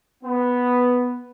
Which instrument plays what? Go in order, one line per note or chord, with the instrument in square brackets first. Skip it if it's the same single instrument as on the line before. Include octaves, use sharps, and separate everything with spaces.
[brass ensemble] B3